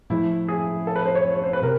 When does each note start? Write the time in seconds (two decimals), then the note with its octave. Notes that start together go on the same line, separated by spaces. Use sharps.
0.10 A2 F3 A3 E4
0.49 G#4
0.87 A4
0.96 B4
1.05 C5
1.15 C#5
1.35 C#5
1.44 C5
1.53 B4
1.63 C3 A#4